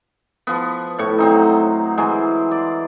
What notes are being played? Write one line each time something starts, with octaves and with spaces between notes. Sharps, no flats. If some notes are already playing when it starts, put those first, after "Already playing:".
F3 B3
A2 C#6
F#3 C4 D#4
E3 G#3
D5